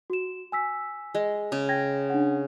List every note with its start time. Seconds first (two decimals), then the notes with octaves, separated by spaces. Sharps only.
0.10 F#4 E7
0.52 G#5 E6 B6
1.15 G#3
1.52 C#3
1.69 G5 G#6 A#6
2.10 D4 F#5